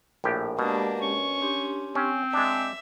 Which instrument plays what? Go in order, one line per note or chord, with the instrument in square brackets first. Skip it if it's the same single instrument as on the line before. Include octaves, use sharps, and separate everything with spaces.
[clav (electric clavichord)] A#1 A2 G4 [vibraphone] A#4
[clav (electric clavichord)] B2 [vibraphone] G#3 G4 [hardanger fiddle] A#3 D4
[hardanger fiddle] C#4 [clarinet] C#6
[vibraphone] D4 G4 C6
[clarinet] C4 [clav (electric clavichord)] C#4
[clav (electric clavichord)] G#3 D4 [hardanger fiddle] E5 [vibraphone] D6